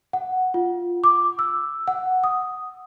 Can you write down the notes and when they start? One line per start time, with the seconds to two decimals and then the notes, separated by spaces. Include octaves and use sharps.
0.13 F#5
0.54 F4
1.04 D6
1.39 E6
1.88 F#5
2.24 D#6